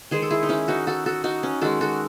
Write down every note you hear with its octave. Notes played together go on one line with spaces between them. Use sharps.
D#3 G#3 G#4 C5
A4
E4 G#4
D#4
C#4 E4
D#4 F#4
F#4 A4
F#4 A4
D#4 F#4
C#4
D#3 G#3 F#4 A4
F#4 A4